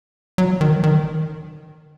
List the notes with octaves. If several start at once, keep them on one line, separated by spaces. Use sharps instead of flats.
F#3
D#3
D#3